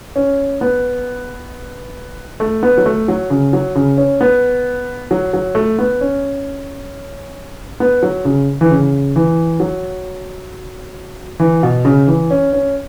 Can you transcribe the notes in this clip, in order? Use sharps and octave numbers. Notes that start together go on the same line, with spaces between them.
C#4
B3
A3
B3
F#3
A3
F#3
C#3
F#3
C#3
C#4
B3
F#3
F#3
A3
B3
C#4
B3
F#3
C#3
E3
C#3
E3
F#3
E3
B2
C#3
E3
C#4
C#4